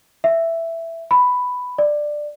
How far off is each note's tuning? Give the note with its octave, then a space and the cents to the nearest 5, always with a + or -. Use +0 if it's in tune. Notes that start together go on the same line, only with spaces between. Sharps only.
E5 +5
B5 +5
D5 +10